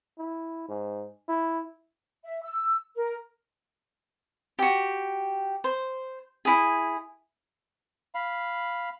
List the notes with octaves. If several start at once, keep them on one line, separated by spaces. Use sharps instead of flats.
E4
G#2
E4
E5
E6
A#4
F#4 G4
C5
E4 G#4
F5 B5